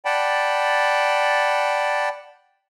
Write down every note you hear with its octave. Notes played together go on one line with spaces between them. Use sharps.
D5 F#5 G5 A5 B5